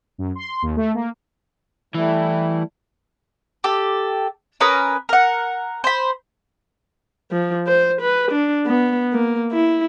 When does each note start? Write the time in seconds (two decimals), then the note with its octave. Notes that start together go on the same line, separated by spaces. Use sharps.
0.18 F#2
0.36 C6
0.62 D#2
0.76 A3
0.94 A#3
1.94 E3 G3 A3 E4
3.64 G4 A4
4.60 C#4 A#4 B4 D#6
5.09 A#4 F#5
5.84 C5 B5
7.32 F3
7.67 C5
8.01 B4
8.31 D4
8.66 B3
9.13 A#3
9.52 E4